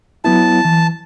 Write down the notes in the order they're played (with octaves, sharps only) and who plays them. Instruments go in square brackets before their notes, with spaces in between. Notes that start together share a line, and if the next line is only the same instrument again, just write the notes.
[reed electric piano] F#3 B3 E4 [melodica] A5
[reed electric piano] E3